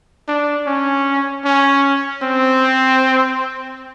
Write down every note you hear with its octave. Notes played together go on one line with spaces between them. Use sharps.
D4
C#4
C#4
C4